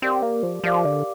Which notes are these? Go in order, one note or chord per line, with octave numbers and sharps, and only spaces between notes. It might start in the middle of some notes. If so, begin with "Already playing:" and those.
C4 G4 A#4 D5 F5 D6
A#3
F3
F3 G4 A#4 D5 F5 D6
D3